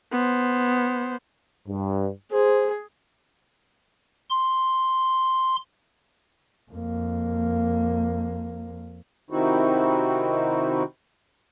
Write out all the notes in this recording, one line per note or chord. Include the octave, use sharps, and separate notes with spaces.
B3 C5
G2
G#4 C5
C6
F2 A#3
C3 D#3 C4 D#4 E4 F#4